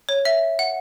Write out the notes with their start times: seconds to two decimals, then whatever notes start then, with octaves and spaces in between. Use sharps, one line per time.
0.09 C#5
0.25 E5
0.59 F#5